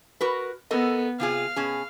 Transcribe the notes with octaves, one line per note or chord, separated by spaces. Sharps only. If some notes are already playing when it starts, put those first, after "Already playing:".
F#4 A#4 B4
B3 A4 A#4 D#5
C3 F4 G#4 F5
B2 C#4 G#4